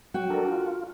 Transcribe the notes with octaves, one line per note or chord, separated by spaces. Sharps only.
F#3 F#4 G5
D4 A4 A#4
F4